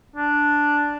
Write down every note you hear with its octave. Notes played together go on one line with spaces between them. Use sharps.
D4